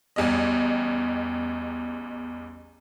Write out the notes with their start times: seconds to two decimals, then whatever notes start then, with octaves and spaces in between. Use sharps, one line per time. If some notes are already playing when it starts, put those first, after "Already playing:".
0.16 A1 E2 G3 D#5